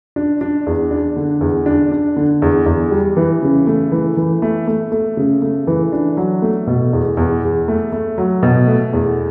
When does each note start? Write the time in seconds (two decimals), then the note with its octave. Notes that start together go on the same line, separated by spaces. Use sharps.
0.16 D4
0.41 D4
0.67 E2
0.91 D4
1.16 D3
1.41 E2
1.66 D4
1.92 D4
2.16 D3
2.42 E2
2.66 E2
2.91 G3
3.17 E3
3.42 C#3
3.67 A3
3.92 E3
4.17 E3
4.42 A3
4.67 A3
4.92 A3
5.17 C#3
5.42 A3
5.67 E3
5.92 D4
6.17 F#3
6.42 A3
6.67 B2
6.93 E2
7.17 E2
7.43 E2
7.68 A3
7.92 A3
8.18 F#3
8.43 B2
8.67 A3
8.93 E2